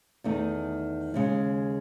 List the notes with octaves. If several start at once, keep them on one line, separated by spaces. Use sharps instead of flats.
E2 D#3 A3 D#4
D#2 C#3 G#3